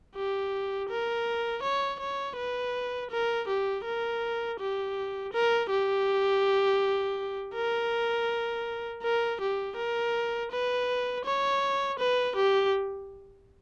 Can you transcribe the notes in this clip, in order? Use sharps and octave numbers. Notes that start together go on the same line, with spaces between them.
G4
A#4
C#5
C#5
B4
A#4
G4
A#4
G4
A#4
G4
A#4
A#4
G4
A#4
B4
C#5
B4
G4